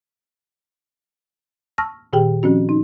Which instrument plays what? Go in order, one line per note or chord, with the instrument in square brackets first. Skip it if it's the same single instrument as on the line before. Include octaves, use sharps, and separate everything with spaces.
[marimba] A5 C#6 E6 F6 A#6
A#2 D#3 G4 G#4 G5
F3 C4 C#4 F#4
D#4